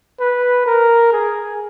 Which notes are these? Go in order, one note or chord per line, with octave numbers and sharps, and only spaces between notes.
B4
A#4
G#4